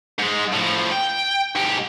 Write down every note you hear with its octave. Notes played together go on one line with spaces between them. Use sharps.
G#2 G#3
A2 F3
G5
G#2 G4